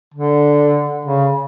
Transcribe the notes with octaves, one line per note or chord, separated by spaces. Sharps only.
D3
C#3